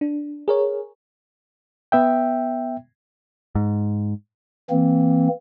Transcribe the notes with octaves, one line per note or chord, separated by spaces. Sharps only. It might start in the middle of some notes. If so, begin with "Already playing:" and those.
D4
G#4 A#4 C#5
B3 E5 G5
G#2
E3 A#3 C4